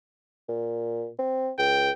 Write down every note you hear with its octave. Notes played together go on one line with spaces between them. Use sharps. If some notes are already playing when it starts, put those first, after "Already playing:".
A#2
C4
C#2 G5